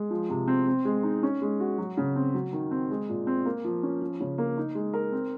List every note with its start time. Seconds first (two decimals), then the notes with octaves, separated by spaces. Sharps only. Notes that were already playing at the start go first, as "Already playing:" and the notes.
Already playing: G#3
0.10 F3
0.30 C3
0.48 C4
0.67 C4
0.85 G#3
1.03 D#4
1.23 C#4
1.42 G#3
1.60 F#4
1.78 F#3
1.97 C#3
2.16 C4
2.34 F#3
2.52 D#3
2.71 C4
2.90 G#3
3.09 A#2
3.27 C4
3.45 A#3
3.64 F3
3.83 C#4
4.01 F3
4.20 C#3
4.38 A#3
4.57 D#4
4.75 G#3
4.93 A#4
5.12 C4